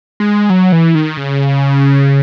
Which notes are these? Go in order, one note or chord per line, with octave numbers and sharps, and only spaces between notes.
G#3
F#3
E3
D#3
C#3